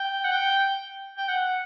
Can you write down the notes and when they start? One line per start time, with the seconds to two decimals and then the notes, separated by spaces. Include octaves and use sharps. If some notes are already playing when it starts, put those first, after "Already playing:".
Already playing: G5
0.24 F#5
0.31 G5
1.18 G5
1.28 F#5